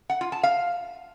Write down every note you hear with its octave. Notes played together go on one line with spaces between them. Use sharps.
F#5
F4
A5
F5